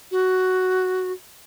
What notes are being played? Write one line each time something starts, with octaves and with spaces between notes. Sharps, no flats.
F#4